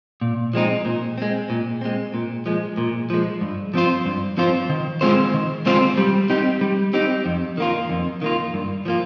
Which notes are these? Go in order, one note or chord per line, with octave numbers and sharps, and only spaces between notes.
A#2
F3 G#3 C4 D#4
A#2
G#3 C4
A#2
G#3 C4
A#2
F3 G#3
A#2
F3 G#3
G2
F3 C4 F4 C5
G2
F3 C4 F4 C5
D#3
G#3 C4 F4 C5
D#3
G#3 C4 F4 C5
G3
C4 D#4 G4
G3
C4 D#4 G4
F2
D#3 A#3 F4
F2
D#3 A#3 F4
G2
F3 A#3 F4